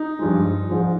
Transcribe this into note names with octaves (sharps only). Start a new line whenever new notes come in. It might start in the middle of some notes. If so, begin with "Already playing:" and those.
Already playing: D#4
G2 F3 G#3
G#2 F3 G#3